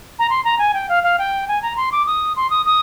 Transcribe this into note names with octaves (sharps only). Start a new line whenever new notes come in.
A#5
C6
A#5
G#5
G5
F5
F5
G5
G#5
A#5
C6
D6
D#6
C6
D#6
D#6